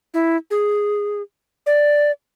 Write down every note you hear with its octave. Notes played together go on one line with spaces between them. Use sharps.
E4
G#4
D5